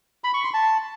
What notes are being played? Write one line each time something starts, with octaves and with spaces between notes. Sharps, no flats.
B5
C#6
C6
A5